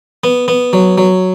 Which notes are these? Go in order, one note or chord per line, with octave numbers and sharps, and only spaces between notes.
B3
B3
F#3
F#3